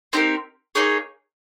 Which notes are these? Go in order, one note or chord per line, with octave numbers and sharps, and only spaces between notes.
C4 D#4 G4 A#4
A#3 D#4 G#4 C#5